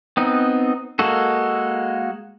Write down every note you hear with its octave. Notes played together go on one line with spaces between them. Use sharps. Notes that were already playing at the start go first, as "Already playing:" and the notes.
B3 C4 D#4
G#3 A#3 F#4 A4